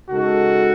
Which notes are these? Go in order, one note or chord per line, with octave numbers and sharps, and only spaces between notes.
C#3 G#3 D#4 F#4 A4